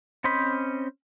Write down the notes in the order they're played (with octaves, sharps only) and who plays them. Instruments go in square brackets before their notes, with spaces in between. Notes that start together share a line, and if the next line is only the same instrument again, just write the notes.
[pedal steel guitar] C4 C#4 C5 D#5 B5